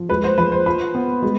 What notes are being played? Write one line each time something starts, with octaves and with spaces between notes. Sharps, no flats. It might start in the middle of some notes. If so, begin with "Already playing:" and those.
Already playing: F3
G#3 B4
C5
F3 B4
C5
F4 B5
B3
G#3